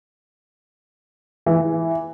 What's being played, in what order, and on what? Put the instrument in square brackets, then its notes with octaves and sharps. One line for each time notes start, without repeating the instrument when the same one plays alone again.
[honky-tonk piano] E3